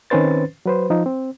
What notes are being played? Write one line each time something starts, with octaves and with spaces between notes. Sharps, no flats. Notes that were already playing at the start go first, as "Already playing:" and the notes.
D#3 C4 C#4 B4 C5 A6
F#3 B4 C5
F3 D#4
C4